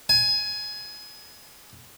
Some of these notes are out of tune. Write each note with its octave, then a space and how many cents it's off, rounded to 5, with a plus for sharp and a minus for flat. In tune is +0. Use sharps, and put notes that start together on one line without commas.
G#5 +20